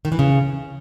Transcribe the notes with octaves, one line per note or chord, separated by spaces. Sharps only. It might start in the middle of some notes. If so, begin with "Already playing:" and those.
D#3
E3
C#3